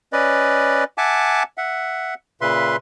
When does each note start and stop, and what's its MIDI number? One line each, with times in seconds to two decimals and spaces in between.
0.13 0.84 61
0.13 0.84 71
0.13 0.84 74
0.13 0.84 75
0.98 1.43 76
0.98 1.43 78
0.98 1.43 80
0.98 1.43 81
0.98 1.43 86
1.58 2.14 76
1.58 2.14 78
2.41 2.76 46
2.41 2.76 49
2.41 2.76 71
2.41 2.76 76
2.41 2.76 84